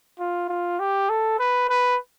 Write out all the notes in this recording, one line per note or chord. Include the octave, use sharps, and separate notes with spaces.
F4
F4
G4
A4
B4
B4